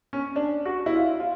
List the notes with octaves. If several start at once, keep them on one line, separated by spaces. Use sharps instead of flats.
C#4
D4
F#4
E4
F4
F4